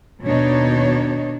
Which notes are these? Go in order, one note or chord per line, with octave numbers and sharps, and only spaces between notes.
D#2 B2 D4 D#4 C#5